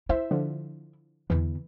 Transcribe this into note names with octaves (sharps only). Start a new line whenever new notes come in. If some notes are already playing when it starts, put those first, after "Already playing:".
E4 C5 E5
D3 F3
E2 D3 E3